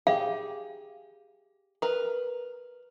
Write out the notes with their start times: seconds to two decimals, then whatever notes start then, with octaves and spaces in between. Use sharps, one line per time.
0.07 G4 G#4 F5
1.82 A#4 B4